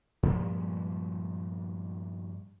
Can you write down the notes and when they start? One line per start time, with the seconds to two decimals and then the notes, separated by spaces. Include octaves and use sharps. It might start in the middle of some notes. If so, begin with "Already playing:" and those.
0.23 G2 A#2 F3 G#3